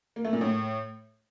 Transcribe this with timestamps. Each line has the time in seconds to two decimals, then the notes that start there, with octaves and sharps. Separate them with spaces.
0.16 A#3
0.25 A3
0.33 A#2
0.41 A2